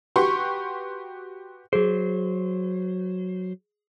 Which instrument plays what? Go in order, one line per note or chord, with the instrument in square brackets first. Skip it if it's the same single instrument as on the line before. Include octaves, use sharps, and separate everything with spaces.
[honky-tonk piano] F#4 G4 B4 C6 C#6
[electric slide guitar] F#3 C5 [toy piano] G#4